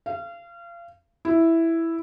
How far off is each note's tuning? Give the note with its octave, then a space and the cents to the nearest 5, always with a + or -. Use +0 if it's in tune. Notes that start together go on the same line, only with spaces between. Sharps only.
F5 -30
E4 +0